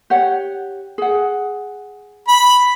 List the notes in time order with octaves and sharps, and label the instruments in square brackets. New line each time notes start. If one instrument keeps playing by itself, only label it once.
[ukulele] G4 C#5 F#5
G#4 F#5
[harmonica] B5